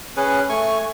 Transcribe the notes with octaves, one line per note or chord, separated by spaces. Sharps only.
C#4 G#4 B4
A3 G#5 C#6